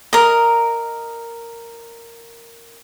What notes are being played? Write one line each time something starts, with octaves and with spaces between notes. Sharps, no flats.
A#4 D#5